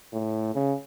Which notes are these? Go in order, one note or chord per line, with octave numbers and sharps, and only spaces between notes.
A2
C#3